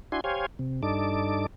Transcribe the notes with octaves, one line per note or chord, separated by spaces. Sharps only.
D4 E4 F#4 G#5 C6
G4 C5 C#5 F5 G#5
C3
G2 D4 D#4 A4 D6